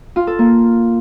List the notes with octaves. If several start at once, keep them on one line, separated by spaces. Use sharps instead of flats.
F4
A4
A#3